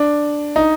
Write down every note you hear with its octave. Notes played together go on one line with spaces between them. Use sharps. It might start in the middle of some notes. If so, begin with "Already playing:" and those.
Already playing: D4
D#4